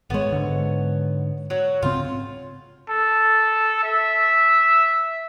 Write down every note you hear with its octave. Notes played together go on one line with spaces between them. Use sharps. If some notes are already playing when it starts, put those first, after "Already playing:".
G#1 G#3 B3 C#5
G#2 D3
F#3 F#4
G#2 C#3 C4 F4
A4
E5